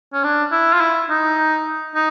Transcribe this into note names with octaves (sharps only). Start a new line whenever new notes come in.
C#4
D4
E4
F4
E4
D#4
D#4